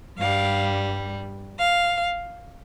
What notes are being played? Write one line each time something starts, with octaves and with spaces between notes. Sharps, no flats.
G2 G3 F5
F5